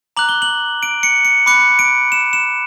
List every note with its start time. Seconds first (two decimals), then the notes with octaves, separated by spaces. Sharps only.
0.17 A#5 D6 F#6 F#7
0.29 G7
0.42 F#7
0.83 D7
1.03 C#7
1.25 C#7
1.46 B5 D6 F#6 C#7
1.79 D7
2.12 E7
2.33 E7